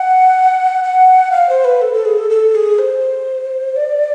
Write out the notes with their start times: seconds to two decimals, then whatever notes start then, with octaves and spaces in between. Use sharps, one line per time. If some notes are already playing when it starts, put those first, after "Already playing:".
Already playing: F#5
0.84 F#5
1.32 F5
1.49 C5
1.65 B4
1.81 A4
1.93 A4
2.05 G#4
2.18 A4
2.30 A4
2.55 G#4
2.79 C5
3.76 D5